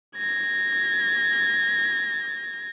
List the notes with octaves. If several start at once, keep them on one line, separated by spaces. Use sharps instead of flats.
G#6 A#6